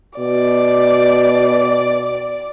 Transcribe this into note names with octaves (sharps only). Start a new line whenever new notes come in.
B2 D5